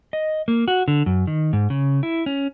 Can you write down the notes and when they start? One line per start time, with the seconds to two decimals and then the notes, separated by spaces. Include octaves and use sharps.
0.13 D#5
0.48 A#3
0.68 F#4
0.88 D3
1.06 F#2
1.27 D#3
1.53 G#2
1.70 C#3
2.03 E4
2.26 C#4